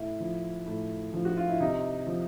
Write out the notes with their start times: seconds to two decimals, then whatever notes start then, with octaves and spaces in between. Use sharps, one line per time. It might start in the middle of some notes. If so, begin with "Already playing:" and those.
Already playing: A2 E4
0.20 F3
0.66 A2
1.14 F3
1.25 F#4
1.37 F4
1.49 E4
1.60 C3 D#4
2.07 F3